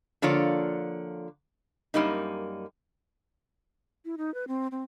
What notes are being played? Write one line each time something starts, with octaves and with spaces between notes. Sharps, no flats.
D3 F3 A#3 F4 C#5 D5
F#2 G3 A#3 D#4
E4
D#4
B4
C4
C4